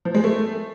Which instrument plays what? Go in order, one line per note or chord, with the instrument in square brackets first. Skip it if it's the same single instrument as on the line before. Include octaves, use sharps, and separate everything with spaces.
[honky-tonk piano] F3
G#3
A3